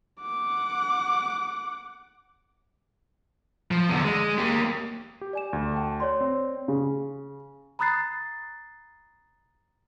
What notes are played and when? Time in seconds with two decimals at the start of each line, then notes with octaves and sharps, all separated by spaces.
0.21 F#5 D6
3.71 F3
3.89 E2 D3
4.05 G#3
4.38 A#3 G4
5.21 G4
5.33 D5 G#5 E7
5.53 D2
5.74 G5 A5
6.00 C#5 D5 C6
6.21 C4
6.68 C#3
7.79 A#5 B5 D#6 F#6 A6 C7